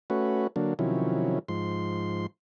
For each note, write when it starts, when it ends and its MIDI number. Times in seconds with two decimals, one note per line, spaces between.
0.10 0.47 57
0.10 0.47 61
0.10 0.47 66
0.10 0.47 71
0.56 0.74 50
0.56 0.74 54
0.56 0.74 58
0.56 0.74 62
0.79 1.39 48
0.79 1.39 51
0.79 1.39 53
0.79 1.39 54
0.79 1.39 61
0.79 1.39 64
1.48 2.26 44
1.48 2.26 53
1.48 2.26 84